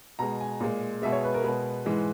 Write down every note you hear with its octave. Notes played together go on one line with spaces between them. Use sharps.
B2 G#3 A#5
G#5
A#2 G#3
B2 G#3 E5
C#5
B4
A#4
B2 G#3 B4
G#2 E3 G#3